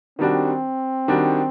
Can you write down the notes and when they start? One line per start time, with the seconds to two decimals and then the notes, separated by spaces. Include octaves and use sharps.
0.19 D#3 G3 C4 D4 F#4
1.08 D#3 G3 D4 F#4